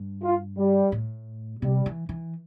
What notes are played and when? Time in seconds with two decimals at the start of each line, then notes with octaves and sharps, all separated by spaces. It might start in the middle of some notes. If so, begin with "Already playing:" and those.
Already playing: G2
0.22 F4
0.57 G3
0.92 A2
1.62 C3 G3
1.86 E3
2.09 E3